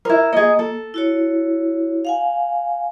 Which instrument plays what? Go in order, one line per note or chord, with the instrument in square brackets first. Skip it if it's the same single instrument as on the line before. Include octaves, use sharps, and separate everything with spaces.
[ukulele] E4 A#4
[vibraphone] A#3 [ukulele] G#4 D#5
[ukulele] A4
[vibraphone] E4 F#4 C#5
F5 F#5 G#5